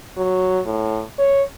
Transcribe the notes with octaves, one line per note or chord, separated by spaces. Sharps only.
F#3
A2
C#5